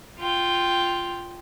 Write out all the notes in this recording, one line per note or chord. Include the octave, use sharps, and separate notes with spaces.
F4 G5